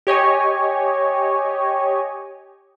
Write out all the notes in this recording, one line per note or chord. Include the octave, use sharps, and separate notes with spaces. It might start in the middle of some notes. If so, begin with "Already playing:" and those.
G4 C#5 D#5 G#5